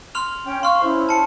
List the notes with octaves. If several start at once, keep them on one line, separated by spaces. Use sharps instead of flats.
C6 F6 F7
C#4 G5
F5 C6 C#6 F6
C#4 E4 C5
A5 C#7